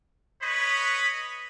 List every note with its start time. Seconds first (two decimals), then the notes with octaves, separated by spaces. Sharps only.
0.43 B4 C#5 D#5 B5 C#6